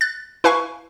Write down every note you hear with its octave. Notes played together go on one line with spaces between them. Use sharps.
F#6 A6
E4 B4 F5 G#5 C#6